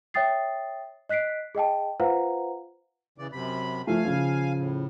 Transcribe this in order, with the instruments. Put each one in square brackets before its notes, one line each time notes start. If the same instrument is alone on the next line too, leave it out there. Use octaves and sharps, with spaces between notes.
[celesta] C#5 E5 G5 D#6 A6 C7
D#5 F#6 B6 C7 D7
G#4 D#5 G5 A5
F4 B4 C5 F5 F#5 A#5
[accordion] C#3 E3 D5
F#2 C3 B5
[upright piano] F3 A3 [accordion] F5 G#5
[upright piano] C#3 F3
[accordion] A2